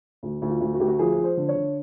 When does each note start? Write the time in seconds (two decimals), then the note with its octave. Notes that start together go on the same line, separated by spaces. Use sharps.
0.23 D2
0.42 D2
0.49 F4
0.61 D2
0.74 F#4
0.80 D2 G4
0.88 F#4
0.99 F3 G#4
1.17 F3
1.24 C5
1.37 D3
1.48 C#5
1.55 D3